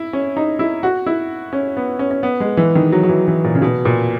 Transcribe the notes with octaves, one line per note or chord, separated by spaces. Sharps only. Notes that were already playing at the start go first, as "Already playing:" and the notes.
Already playing: E4
C#4
D#4
E4
F#4
E4
C#4
B3
C#4
C#4
B3
G#3
E3
D#3
F#3
F#3
E3
E3
A#2
C#3
B2
A#2